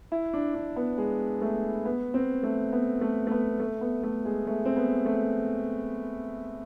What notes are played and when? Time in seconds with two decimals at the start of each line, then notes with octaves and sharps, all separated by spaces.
0.12 E4
0.33 D4
0.55 D4
0.76 B3
0.98 G#3
1.42 A3
1.85 B3
2.14 C4
2.43 A3
2.73 B3
3.01 A3
3.27 A3
3.31 B3
3.60 A3
3.81 B3
4.03 A3
4.25 G#3
4.47 A3
4.65 C4
4.77 B3
5.06 A3